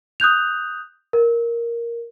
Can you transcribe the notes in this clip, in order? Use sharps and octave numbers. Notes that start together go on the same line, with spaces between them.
D#6 F#6 G6 F7
A#4